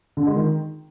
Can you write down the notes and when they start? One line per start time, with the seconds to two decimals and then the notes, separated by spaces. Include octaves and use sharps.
0.17 D3
0.26 G#3
0.36 D#3